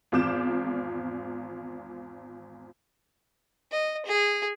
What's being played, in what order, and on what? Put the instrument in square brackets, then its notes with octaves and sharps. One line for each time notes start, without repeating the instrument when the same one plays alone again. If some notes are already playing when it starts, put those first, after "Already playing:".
[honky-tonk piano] G#1 E2 F4 D6 G6 E7
[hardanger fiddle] D#5
G#4